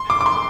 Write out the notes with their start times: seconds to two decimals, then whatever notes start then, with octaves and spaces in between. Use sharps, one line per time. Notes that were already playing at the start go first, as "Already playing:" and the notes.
Already playing: C6
0.10 D6
0.21 D6
0.26 C6